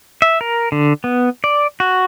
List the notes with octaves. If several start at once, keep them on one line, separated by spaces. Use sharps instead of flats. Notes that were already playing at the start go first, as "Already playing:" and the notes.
E5
A#4
D3
B3
D5
F#4